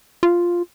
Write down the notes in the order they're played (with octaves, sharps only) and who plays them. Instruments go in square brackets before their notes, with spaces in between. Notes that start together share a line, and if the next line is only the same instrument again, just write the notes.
[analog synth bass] F4